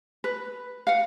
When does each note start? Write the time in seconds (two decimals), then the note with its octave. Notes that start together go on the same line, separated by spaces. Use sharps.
0.24 B4
0.87 F5 F#5